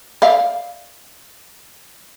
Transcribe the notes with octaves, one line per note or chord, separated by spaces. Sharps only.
D5 E5 F5